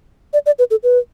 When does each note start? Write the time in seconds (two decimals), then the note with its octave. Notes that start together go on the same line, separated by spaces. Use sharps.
0.33 D5
0.46 D5
0.59 B4
0.71 A4
0.83 B4